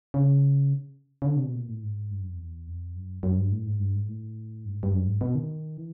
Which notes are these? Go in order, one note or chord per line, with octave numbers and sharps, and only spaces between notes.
C#3
C#3
D3
C3
B2
A#2
A2
G#2
G2
F#2
F2
E2
F2
F#2
F#2
G2
A2
G#2
G2
G#2
A2
G2
G#2
G2
F#2
G#2
B2
D#3
E3